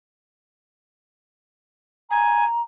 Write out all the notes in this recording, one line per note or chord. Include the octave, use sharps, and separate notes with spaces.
G#5 A#5